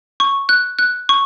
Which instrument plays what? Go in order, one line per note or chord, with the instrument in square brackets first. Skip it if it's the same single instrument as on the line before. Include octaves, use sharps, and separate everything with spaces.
[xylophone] C#6
F#6
F#6
C#6